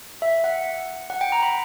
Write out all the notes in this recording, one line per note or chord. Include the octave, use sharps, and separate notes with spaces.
E5
F#5
F#5
G5
A#5
B5